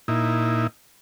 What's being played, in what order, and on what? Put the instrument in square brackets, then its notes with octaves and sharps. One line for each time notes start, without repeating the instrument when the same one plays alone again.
[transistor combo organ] A#2 D#4 E4